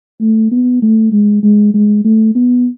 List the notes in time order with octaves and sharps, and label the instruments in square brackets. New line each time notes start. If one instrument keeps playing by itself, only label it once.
[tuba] A3
B3
A3
G#3
G#3
G#3
A3
B3